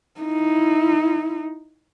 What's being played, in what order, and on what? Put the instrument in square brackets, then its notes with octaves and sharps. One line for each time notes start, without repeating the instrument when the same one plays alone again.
[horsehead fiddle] D#4 E4